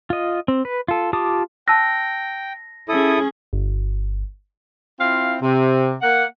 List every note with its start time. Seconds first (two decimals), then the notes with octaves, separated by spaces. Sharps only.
0.10 F4 D#5
0.48 C4
0.65 B4
0.88 F4 A4
1.13 F4 G4 A5 D6 D#6
1.68 G5 A5 E6 F#6 A#6
2.89 C#4 E4 G#4 A4 D#6
3.53 G1
5.00 C4 E4 F4 F5
5.40 C3
6.02 A#3 F#5